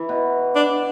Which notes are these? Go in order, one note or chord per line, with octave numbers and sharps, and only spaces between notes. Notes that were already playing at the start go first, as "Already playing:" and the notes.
Already playing: E3
B2
D4